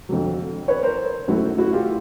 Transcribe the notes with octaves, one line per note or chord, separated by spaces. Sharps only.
F2 D3 F#3
B4 C#5
A#4 C5
F#2 D#3 F#3 A3 E4 F#4
E4 F#4
F4 G4